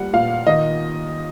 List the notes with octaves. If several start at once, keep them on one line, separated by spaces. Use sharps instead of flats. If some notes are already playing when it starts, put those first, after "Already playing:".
Already playing: A#2 G3 F#5
A#2 F5
D#3 D#5